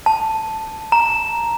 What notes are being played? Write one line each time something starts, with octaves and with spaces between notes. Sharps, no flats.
A5
A#5